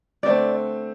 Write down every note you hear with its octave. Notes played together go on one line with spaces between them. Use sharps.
D3 A3 C4 D5